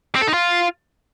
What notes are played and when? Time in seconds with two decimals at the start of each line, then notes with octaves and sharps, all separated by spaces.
0.15 C4
0.21 A4
0.28 D#4
0.34 F4